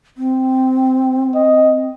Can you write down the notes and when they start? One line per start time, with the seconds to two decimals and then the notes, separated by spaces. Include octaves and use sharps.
0.17 C4
1.35 D#5